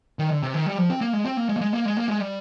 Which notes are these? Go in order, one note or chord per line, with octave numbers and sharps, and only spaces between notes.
D#3
D3
C3
D#3
G3
F3
C4
A#3
G#3
C4
A#3
G#3
A#3
G#3
A#3
G#3
A#3
G#3
G3